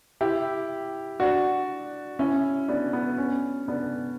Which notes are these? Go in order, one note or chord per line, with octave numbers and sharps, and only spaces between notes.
E4 G4
D4 F#4
C#4 E4
B3 D4
B3
C#4
B3 D4